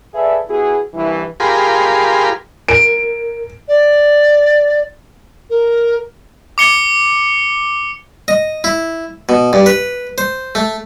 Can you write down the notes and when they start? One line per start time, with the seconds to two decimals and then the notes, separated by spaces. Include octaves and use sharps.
0.14 G#4 A4 B4 D5 E5
0.48 B3 E4 F#4 G#4
0.94 C2 G2 E3
1.40 F4 G4 G#4 A#4 B5 C6
2.68 A#4 D7
3.68 D5
5.50 A#4
6.58 D6 C#7 G7
8.28 D#5
8.64 E4
9.29 B2
9.53 G2
9.66 B4
10.18 C5
10.55 A3